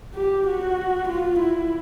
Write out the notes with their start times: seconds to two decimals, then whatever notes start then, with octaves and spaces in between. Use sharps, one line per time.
0.15 G4
0.47 F#4
1.08 F4
1.39 E4